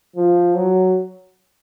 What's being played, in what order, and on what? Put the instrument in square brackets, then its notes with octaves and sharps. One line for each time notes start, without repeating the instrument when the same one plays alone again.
[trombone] F3
F#3